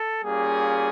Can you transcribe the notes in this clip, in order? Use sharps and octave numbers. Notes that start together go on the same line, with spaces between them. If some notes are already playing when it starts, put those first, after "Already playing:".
Already playing: A4
G3 A#3 C#4 F4 G#4